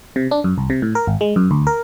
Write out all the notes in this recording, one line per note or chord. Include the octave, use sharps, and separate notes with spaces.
C3
D4
F#2
C2
C3
A2
A#4
G#1
G#3
F#2
D2
A#4